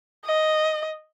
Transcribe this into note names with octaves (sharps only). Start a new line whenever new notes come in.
D#5